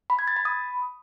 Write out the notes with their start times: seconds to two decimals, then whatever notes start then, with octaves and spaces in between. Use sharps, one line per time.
0.10 B5
0.19 G#6
0.28 A6
0.36 B5
0.45 D#6